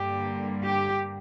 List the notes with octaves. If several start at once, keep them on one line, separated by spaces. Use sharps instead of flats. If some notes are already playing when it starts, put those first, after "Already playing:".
Already playing: G2 D3 G3 A#3 G4
G4